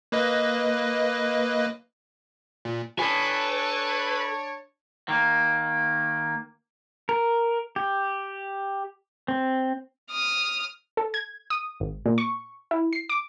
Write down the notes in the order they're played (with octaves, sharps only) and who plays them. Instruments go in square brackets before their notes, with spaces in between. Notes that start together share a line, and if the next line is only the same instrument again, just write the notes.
[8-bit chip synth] A#3 B4 D#5
A#2
[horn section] D4 C#5 [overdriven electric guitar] A4 G#5 [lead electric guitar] B4
[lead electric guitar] D#3 A#3
[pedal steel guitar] A#4
G4
C4
[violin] D#6 F6
[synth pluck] A4
G#6
D#6
G#1
A#2
C#6
E4
C7
D6